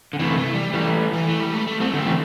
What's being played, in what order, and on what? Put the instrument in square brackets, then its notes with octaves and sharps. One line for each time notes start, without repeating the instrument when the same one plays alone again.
[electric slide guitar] D3
[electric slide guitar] C3 E3 [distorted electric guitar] A3
[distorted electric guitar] A3
G3
[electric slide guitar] E3 A3 [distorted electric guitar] G3
[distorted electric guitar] E3
A3
G3
A3
A3
[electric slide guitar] G3 C4 [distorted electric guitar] A3
[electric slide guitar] D3 G3
[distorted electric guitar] C4
[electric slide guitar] E3 A3